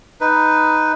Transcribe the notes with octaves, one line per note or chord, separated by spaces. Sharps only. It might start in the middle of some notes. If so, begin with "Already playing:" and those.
D#4 B4